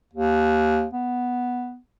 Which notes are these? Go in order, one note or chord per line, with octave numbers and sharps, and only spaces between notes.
D#2
B3